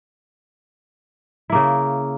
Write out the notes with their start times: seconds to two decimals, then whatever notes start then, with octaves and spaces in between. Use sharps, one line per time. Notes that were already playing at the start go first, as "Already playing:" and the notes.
1.50 E4
1.52 A#3
1.55 C#3